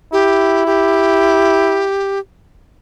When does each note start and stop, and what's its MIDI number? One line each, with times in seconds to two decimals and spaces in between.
0.13 1.88 64
0.13 0.64 67
0.66 2.19 67